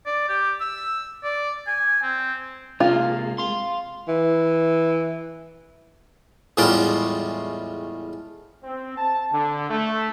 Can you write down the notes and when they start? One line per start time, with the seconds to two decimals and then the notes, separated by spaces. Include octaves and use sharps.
0.06 D5
0.29 G4
0.60 E6
1.23 D5
1.67 G#5
2.03 C4
2.80 C3 G#3 A#3 F4
3.38 F5 C6
4.08 E3
6.57 E2 A2 G3 G#3 F4 D5
8.64 C4
8.98 A5
9.33 D3
9.70 A3